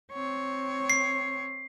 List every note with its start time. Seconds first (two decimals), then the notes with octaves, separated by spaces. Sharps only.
0.12 C4 C#5
0.90 C7